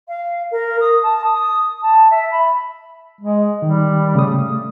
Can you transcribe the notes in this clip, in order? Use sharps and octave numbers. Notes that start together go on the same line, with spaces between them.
F5
A#4
D#6
A5
D#6
A5
E5
B5
G#3
D#3 G3
C#3 A3 D#6